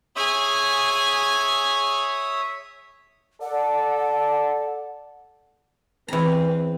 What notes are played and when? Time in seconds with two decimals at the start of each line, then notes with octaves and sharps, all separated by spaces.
0.16 G#4 C#5 E5 G#5 D#6
3.42 A4 D5 F#5
6.08 E2 C4 B4 A#5